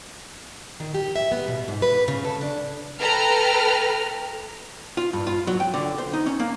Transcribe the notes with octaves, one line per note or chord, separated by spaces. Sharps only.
D#3
G4
E5
B3
B2
G#2
B4
C#3
A4
D4
A4 B4 G5 A#5 F6
F4
G2
F4
F#3
G5
D3
C5
D#4
C#4
A#3